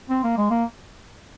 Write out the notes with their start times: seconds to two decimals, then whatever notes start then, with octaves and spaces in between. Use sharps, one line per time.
0.09 C4
0.23 A#3
0.37 G#3
0.50 A#3